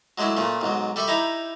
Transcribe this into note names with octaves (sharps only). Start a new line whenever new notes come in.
F#3 G#3 A3 D4 E4
A#2 C#3 A3
B1 G#2 F#3
G3 A4 D5 E5 B5 C#6
D#4 E4 G4 A#5 B5